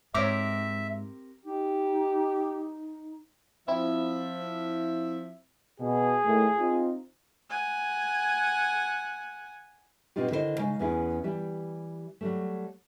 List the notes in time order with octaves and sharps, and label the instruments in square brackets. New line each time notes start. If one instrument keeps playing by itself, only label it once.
[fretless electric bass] G#2 [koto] C4 G4 A#4 [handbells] C#5 D6 [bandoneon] E5
[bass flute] D#4 [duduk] G4
[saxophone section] F3 E5 [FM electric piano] C4 E4
[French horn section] B2 [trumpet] G#4
[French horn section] A2 D#3 A3
C4 D#4 F4
[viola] F#5 G#5
[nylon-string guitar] B2 C4 D#4 F4 G4
D3 D#3 E4 G#4 C5 D#5
C#3 G#3 D#4
E2 B3 C#4 E4 G#4
E3 G3 G4
F#3 G3 A3